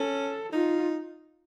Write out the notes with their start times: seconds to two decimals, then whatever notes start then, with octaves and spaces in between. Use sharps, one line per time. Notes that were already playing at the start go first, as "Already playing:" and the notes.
Already playing: C#4 A4
0.52 D#4 F4